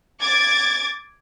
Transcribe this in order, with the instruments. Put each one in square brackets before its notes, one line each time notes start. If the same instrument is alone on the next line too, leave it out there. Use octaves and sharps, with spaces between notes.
[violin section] D6 G#6 A6